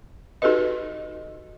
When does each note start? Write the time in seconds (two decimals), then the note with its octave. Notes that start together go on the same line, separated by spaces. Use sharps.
0.42 D#4 F#4 G4 A4 B4 D#5